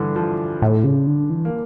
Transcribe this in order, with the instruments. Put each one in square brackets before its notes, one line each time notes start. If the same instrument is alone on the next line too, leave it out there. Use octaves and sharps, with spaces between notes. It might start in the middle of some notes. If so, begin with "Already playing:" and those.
Already playing: [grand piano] G2 D3 E3
F3
[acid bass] A2
C#3
D3
E3
[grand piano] A#3